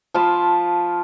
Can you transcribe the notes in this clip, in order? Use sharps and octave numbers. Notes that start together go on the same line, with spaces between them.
F3 F4 A5 B5